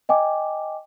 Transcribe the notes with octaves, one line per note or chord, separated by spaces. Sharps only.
D#5 G5 G#5 D6